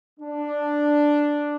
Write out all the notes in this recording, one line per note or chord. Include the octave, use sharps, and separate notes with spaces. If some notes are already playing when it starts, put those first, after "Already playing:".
D4